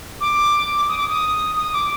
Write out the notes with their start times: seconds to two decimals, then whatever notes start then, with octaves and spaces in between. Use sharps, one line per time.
0.21 D6
0.88 D#6
0.98 D6
1.08 D#6
1.56 D#6
1.73 D6